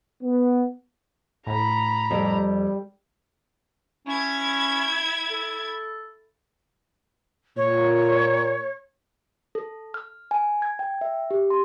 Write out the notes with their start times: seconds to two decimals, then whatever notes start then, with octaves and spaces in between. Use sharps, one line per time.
0.22 B3
1.47 A2 A#5 B5
2.11 F2 G3
4.07 C#4 E4 G#6
5.31 A4
7.57 A#2 C#5
9.55 A4
9.94 F6
10.31 G#5
10.62 G#6
10.79 G5
11.01 E5
11.31 G4
11.50 C6